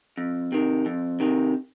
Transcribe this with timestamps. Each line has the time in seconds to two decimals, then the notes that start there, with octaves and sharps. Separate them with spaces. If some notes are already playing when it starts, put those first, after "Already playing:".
0.18 F2
0.52 C3 D#3
0.86 F2
1.20 C3 D#3